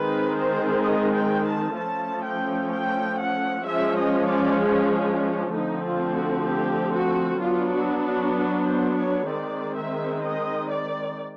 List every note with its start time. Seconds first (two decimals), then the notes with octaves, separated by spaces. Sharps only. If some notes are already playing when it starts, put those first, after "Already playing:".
Already playing: D#3 G#3 C4 B4
0.36 C5
0.83 D#5
1.14 G5
1.46 A5
1.76 F3 A3 C#4 A5
2.24 G5
2.71 G5
3.18 F#5
3.65 F3 G#3 C#4 E5
3.97 D#5
4.28 D5
4.59 G#4
5.06 D4
5.53 D3 F3 A3 C4 D#4
5.85 F4
6.16 F#4
6.47 G4
6.94 F#4
7.41 F#3 B3 D4 F4
7.72 F#4
8.04 F#4
8.35 F#4
8.67 C5
8.98 C#5
9.29 D#3 G#3 C4 D5
9.76 E5
10.23 D#5
10.70 D5